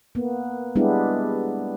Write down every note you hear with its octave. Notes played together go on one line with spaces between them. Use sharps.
A#3 B3
G3 G#3 B3 D4 E4 G4